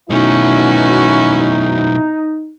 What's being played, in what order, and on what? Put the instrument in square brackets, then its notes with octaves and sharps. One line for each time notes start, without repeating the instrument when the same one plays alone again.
[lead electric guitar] B1 A3 [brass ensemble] B2 E4 [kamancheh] C#4 F#4 [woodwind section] D#4